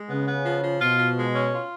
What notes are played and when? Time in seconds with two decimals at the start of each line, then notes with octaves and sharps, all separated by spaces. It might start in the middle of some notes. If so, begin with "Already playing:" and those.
Already playing: G#3
0.10 C#3 B3
0.28 B3
0.45 F3
0.63 F3
0.81 B2 F4
0.99 F3
1.17 G#3
1.35 C#4
1.53 F4